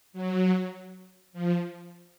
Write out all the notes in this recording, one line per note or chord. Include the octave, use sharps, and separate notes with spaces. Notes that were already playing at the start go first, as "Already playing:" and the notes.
F#3
F3